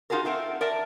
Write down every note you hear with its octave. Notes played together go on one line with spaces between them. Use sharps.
D#4 F4 F#4 G#4 A#4
A3 C4 A#4 F#5
A#4 D5 E5 A5